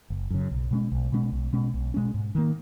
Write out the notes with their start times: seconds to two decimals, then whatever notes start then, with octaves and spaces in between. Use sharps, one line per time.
0.10 F#1
0.30 F#2 C#3
0.51 B1
0.71 B2 G#3 C#4
0.92 B1
1.12 B2 G#3 C#4
1.32 B1
1.53 B2 G#3 C#4
1.74 B1
1.94 B2 G#3 C#4
2.14 G#2
2.35 D#3 A#3